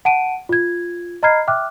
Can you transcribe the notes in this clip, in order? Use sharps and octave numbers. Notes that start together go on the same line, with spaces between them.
F#5 A5 D7 D#7
F4 G#6
D#5 A#5 B5 F6 G#6 C7
E5 G5 D6 F6 F#6